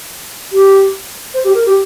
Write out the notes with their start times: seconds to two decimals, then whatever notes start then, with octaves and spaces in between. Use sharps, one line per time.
0.52 G4
1.34 C5
1.44 G4
1.55 A#4
1.66 G4